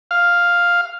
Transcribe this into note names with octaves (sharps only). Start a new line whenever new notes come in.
F5